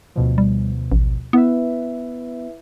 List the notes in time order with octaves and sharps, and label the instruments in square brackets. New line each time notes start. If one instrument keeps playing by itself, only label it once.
[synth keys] D2 B2 F3
[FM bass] G3
A1
[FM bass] B3 [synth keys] E4 B4 E5